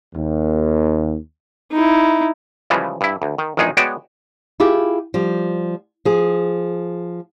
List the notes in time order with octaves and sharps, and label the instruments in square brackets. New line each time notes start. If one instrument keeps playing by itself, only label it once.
[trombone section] D#2
[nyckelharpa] D#4 E4
[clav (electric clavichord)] C#3 E3 F3 G3 G#3
G2 E4
D2
D#3
A#1 E2 D#3 G#3 D#4 G#4
G#3 B3 F#4 C#5 D5 G5
[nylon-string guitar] E4 F4 G4 G#4
F3 G3
F3 G#4